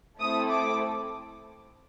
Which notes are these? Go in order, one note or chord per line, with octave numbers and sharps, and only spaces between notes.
A3 C4 E4 A4 D#6
D6